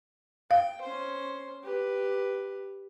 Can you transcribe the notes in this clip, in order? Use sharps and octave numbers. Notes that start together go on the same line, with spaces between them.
F5 G5
C#4 C5
G4 B4